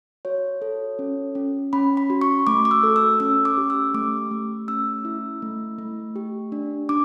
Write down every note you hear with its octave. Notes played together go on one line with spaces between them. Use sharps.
F#4 C#5
A4
C#4
C#4
C#4 B5
B5
F#4
C#6
A3 D6
D6
E6
A4
E6
C#4 E6
D6
G4
E6
A3 D6
A3
C#4 E6
E4
A3
A3
G4
D4
D4 D6